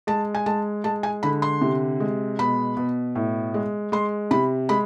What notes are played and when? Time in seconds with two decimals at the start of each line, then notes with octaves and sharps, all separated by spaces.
0.07 G#3 A5
0.35 G#5
0.46 G#3 A5
0.84 G#3 A5
1.03 G#5
1.23 D3 B5
1.42 C6
1.61 C3
2.00 G#3
2.39 B2 B5
2.77 B2
3.15 A2
3.54 G#3
3.92 G#3 C6
4.31 C3 B5
4.69 G#3 B5